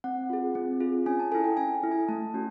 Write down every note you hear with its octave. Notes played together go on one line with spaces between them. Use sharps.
C4 F#5
F4 G#4
C4
F4 G#4
C#4 G#5
A5
E4 A4 G#5
G5
C#4 G#5
G#5
E4 A4
G#5
A3 A5
C#4 F#4